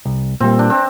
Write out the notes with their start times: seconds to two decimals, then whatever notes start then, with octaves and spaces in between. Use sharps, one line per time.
0.05 C2
0.40 A#2 G3 A#3 C4
0.59 D4
0.70 C4